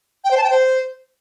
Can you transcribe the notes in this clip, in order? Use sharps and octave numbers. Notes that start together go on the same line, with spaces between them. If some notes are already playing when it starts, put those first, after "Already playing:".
G5
C5
A5
G5
C5